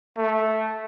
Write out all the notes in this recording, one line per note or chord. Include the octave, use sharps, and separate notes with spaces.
A3